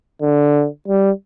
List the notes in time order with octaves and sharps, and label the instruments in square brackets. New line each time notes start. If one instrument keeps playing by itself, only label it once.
[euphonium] D3
G3